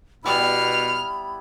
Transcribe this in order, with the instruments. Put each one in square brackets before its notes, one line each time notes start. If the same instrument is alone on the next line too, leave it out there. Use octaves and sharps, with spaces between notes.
[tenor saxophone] B2 [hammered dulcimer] G3 B3 E4 [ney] B5 [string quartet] F6